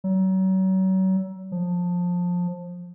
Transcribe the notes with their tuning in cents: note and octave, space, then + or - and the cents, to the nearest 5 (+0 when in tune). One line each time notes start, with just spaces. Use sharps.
F#3 +35
F3 +20